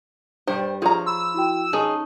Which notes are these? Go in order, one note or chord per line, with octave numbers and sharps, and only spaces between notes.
G2 G3 C5
F3 F4 G#4 C#5 A#5
B5 C6 E6
E4 F#4 G5
C#4 D#4 G#4 G#5 A5 D#6